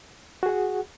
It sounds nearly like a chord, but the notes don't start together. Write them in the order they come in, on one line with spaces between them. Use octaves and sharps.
F#4 G#4 F#5